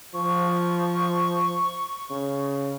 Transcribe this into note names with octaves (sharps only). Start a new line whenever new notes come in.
F3 C#6
C#3